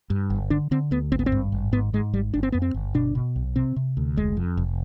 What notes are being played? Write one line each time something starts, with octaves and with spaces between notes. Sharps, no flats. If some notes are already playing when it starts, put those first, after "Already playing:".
G2
G1
D3 D4
D3 C4
D2 B3
G#1 C4
B3
C4
G2
G#1
G#2 B3
G#2 G#3
G#1 G3
G1 D4
C4
F2 B3
C4
G1
B2 D4
B2
B1
C3 C4
C3
D2
F1 G#3
F2
F1